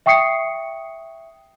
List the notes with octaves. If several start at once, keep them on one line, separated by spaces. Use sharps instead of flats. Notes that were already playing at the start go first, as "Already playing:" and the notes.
E5 G5 C#6 D#6 C7 C#7